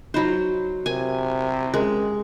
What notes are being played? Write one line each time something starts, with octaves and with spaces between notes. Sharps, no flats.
F#3 D#4 C5 D#5 B5
C3 A#4 G#5
G#3 C#4 A#4